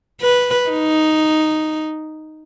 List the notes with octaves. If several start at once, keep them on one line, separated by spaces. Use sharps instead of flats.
B4
D#4